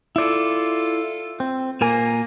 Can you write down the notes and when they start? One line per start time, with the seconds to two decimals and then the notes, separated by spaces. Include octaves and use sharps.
0.16 E4 F4 A4 D5
1.40 C4
1.81 A#2 A#3 A#4 G#5